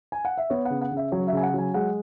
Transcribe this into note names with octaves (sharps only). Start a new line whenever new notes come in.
G#5
F#5
E5
B3 C#5
C#3 F#5
F#5
C#3
E5
F#3 C#5
E5
C#3 G#5
F#5
F#3 G#5
G#3 F#5